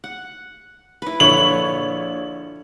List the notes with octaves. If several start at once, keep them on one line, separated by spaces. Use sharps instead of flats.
F#5
E4 B4
A#1 D3 C#5 C#6 F#7